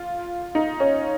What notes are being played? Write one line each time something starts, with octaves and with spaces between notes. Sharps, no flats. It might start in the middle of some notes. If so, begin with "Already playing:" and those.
Already playing: F4
D#4
C#4